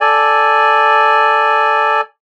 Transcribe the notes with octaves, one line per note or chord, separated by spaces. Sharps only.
A4 D5 G#5